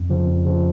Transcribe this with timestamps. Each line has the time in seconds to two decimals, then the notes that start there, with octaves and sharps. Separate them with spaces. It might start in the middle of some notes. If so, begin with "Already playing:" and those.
Already playing: F2
0.09 C#3 F3
0.27 F2
0.45 C#3 F3